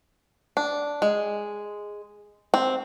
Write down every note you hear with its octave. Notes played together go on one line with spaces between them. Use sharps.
D4
G#3
C4